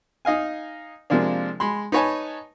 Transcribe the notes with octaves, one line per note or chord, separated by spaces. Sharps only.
D#4 D#5 F5 G#5
C3 F3 G#3 A#3 D4
G#3 B5 C6
D#4 B4 C#5 G#5 A5